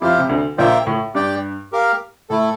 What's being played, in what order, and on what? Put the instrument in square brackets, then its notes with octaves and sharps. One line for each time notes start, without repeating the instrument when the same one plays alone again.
[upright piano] F2 F3 [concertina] E4 G4 C5 F5
[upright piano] C3
D2 D3
[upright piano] A#1 A#2 [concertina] A#3 F4 C5 E5 G5
[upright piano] A2
[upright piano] G2 [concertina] G4 D5 G5
[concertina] G4 A#4 F5
[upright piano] A2 [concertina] A3 E4 A4